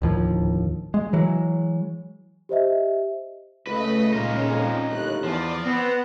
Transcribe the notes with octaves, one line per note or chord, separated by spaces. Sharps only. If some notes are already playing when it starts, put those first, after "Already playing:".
D1 D#2 F3
G#3
E3 F#3 G#3
G4 C5 D#5 E5
C#2 C#3 A3 B4 D#5
A#2 G#3 C#4 D#4 F4
F2
G1 D#2 A2 F#6
E2 F3 F4 D5
B3 C4 F#5